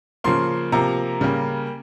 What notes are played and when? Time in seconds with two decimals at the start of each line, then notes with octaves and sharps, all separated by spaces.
0.24 C#3 F3 A#3 C6
0.72 C3 F3 A#3 A#5
1.21 C#3 G3 A#3